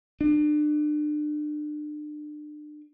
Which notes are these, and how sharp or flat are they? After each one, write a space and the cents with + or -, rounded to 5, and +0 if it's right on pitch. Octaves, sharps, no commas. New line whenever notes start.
D4 +35